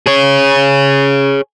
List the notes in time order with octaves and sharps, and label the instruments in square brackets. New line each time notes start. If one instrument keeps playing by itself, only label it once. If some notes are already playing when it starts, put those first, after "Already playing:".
[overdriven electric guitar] G#4 C#5